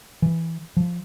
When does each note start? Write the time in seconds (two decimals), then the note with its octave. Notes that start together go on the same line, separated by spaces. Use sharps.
0.22 E3
0.77 F3